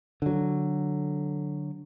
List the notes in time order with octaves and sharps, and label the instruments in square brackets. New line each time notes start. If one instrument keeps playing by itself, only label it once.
[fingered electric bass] D3 F#3